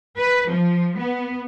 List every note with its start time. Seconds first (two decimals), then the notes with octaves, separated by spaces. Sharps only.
0.17 B4
0.50 F3
0.98 B3